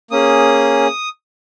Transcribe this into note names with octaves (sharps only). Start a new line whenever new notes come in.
A#3 C#4 G#4 D#6